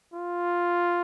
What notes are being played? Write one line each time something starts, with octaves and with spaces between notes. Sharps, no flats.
F4